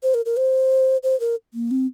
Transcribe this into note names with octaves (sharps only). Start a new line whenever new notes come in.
C5
A#4
A#4
C5
C5
A#4
A#3
C4